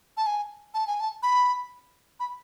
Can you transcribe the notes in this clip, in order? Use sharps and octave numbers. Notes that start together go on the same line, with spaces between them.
A5
G#5
A5
G#5
A5
B5
B5